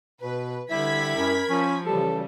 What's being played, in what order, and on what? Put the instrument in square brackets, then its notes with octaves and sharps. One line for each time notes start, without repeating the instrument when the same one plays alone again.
[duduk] B2 [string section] B4
[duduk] D3 [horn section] G3 E4 [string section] B5 G#6 B6
[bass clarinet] F#2 [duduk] A#4
[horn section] F3 [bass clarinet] C#4
[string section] C#3 G3 [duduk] E3 [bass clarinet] A4